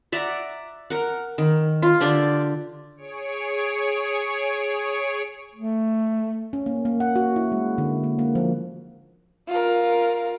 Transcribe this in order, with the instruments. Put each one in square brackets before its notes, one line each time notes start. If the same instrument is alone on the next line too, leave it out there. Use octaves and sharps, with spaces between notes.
[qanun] D5 E5 F#5 A#5
A#4 F#5
D#3
F4
D3 D4 G4 D5
[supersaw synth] G#4 C#5 C#7 D7
[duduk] A3
[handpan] C#4
A#3
A#3
F#5
F#4
E4
G#3
D3
A#3
A#3
F3
[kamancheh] F4 A#4